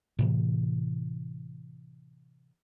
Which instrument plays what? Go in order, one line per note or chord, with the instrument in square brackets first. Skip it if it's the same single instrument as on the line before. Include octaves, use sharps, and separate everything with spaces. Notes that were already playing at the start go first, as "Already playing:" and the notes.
[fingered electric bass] A2 C3 E3